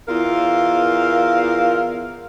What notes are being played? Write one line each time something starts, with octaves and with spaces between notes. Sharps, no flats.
E2 F4 A#4 F5